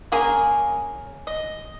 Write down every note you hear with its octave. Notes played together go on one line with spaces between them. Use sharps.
A#3 C#4 G#4 A#4
D#5